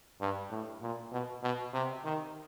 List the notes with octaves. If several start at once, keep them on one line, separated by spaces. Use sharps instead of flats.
G2
A2
A#2
B2
B2
C3
D#3